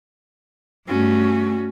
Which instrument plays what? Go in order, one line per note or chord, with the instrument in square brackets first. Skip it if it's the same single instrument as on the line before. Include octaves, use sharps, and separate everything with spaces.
[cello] G2 A3 [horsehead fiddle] C#4 F#4